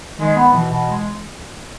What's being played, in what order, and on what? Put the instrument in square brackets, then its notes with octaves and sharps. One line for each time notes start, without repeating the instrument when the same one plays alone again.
[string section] D#3 [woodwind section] G#3
[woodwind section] B3
[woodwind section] B2 [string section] E3
[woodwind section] B2
G#3